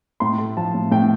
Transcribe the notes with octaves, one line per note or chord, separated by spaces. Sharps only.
A2 C6
A3
F3 A5
A2
A2 G5